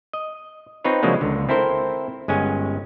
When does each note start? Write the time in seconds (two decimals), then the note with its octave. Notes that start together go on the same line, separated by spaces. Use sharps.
0.13 D#5
0.84 C4 D#4 F4 B4 C#5
1.03 C#3 F3 F#3 G#3 A#3 D4
1.21 C#2 D3
1.49 C4 E4 A4 A#4 C5
2.28 G1 G#3 C#4 G#5